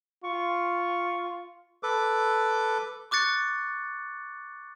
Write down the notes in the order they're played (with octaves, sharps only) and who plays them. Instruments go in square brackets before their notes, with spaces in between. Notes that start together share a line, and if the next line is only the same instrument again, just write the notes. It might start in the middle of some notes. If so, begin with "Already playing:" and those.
[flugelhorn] F4 [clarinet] C#6
[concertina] A4 B4 D6
[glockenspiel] C#6 D6 F#6 A6 C#7